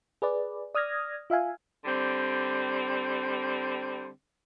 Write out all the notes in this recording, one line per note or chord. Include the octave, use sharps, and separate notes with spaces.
G#4 B4 D5
D5 D#6 F6 G#6 A#6
F4 E5 F5 G#5
D3 G3 C4